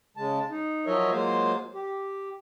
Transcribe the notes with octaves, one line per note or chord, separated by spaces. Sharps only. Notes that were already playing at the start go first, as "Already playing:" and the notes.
C#3 G#3 A5
D#4
F3 F#3 A#4 C#5 D#5 E5
F#3 G#3 A#3 F4 C5 F5
G4